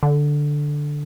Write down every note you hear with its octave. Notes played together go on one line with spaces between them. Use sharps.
D3